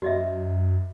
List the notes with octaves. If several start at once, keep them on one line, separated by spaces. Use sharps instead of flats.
F#2 F#4 D#5 E5